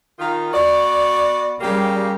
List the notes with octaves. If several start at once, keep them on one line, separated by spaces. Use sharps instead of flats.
D#3 F4
B3 F#4 D5
C#3 G3 A#3 G4